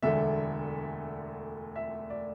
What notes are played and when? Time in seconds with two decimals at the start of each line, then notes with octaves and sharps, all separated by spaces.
0.03 E1 D2 D3 A3 E5
1.76 E5
2.10 D5